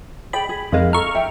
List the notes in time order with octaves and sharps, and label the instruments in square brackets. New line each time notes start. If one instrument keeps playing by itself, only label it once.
[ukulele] G#4 D5 G5 [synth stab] B5
[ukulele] G#4
[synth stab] F2 G#3 [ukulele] D#4 A#4 F5
[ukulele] A4 A#5 [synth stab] C#6 F6
[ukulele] E5 G5